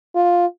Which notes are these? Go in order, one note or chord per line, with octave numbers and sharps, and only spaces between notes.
F4